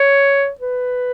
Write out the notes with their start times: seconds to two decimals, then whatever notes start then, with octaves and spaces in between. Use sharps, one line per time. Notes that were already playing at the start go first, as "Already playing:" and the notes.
Already playing: C#5
0.60 B4